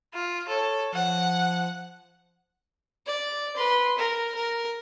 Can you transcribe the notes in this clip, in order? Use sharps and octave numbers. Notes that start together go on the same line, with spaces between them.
F4
A4 C#5
F3 F#5
D5
B4 C6
A#4
A#4